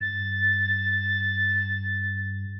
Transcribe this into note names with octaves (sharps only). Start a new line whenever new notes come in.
G2 A6